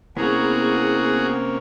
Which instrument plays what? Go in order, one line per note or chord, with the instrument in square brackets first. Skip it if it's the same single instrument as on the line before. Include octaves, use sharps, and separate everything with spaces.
[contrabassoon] E2 [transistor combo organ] C3 A#3 C#4 [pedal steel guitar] B3 A#5 [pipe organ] F#4 G#4